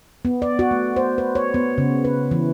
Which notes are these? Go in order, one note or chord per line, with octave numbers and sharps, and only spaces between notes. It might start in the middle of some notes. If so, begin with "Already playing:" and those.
B3
D5
F#4
A3
C5
B4
C#5
B3
C#3
B4
E3